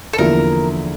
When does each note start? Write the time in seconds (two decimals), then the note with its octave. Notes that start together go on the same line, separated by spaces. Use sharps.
0.13 A4
0.18 E2 D3 F3 A#3 E4 A#4